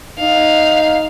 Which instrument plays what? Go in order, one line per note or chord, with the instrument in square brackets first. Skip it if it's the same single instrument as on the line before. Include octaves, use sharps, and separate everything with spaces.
[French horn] D#4 [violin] F5